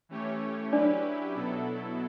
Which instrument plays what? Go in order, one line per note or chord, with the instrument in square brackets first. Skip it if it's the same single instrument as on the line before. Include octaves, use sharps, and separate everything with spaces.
[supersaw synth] E3 A3 C#4 G4 C#5
[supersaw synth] F#3 C#4 E4 G4 B4 [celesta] D4 D5
[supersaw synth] B2 F#3 B3 E4 A4